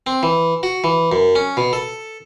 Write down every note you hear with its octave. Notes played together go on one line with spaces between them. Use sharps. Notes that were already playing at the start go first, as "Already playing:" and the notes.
C4
E3
F#4
E3
F#2
C#4
B2
A4